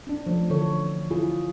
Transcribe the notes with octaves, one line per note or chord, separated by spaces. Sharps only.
C#4 D4
F3 A3
D3 E3 A4 C#5
E4 F4 G#4